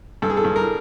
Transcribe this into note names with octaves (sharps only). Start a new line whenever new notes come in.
G2 A4
G#4
A4
G2
A#4